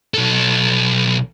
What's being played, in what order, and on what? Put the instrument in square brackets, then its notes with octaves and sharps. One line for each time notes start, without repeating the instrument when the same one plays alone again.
[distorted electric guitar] B1 A4